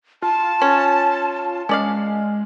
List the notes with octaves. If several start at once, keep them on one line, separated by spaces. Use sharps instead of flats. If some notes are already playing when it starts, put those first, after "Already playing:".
F4 A5
C#4
G#3 C#4 D5 F5